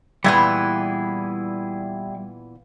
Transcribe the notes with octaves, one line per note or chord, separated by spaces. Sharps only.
A#2 E3 G3 B3 E4 G#4